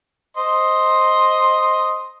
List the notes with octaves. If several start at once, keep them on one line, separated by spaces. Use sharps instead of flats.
C5 D#5 C6